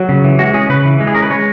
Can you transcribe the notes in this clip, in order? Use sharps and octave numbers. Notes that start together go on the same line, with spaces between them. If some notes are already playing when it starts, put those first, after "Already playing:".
Already playing: F#3
C#3
E3
G#3 F#4
C#4 G#4
C#3 B4
E3
G#3
G#4
C#4 A#4
B4
G#3 C#5